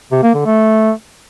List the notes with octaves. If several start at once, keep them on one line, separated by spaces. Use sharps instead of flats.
C3
A#3
D3
A3